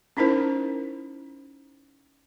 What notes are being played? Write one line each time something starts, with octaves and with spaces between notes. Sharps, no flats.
C#4 D#4 E4 A#4 C5